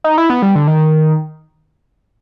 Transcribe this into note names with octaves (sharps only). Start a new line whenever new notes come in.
D#4
E4
B3
G3
D3
D#3